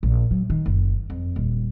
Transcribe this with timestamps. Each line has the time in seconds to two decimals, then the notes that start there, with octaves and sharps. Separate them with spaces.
0.03 A#1
0.31 F#3
0.50 D#3
0.66 F#1
1.10 F2
1.36 D#1